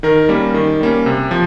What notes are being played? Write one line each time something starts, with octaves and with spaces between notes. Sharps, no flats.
D#3 A#4
G3 A#3 C#4
D#3
G3 A#3 C#4
C3
F3